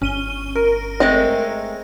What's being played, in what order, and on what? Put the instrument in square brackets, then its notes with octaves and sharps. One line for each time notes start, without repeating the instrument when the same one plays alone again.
[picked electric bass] G1 [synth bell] C#4 D#7 G7
[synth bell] A#4
[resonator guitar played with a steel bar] G#3 A3 C4 [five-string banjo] D#5